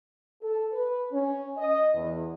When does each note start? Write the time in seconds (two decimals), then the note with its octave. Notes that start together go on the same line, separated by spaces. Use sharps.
0.41 A4
0.72 B4
1.12 C#4
1.58 D#5
1.94 E2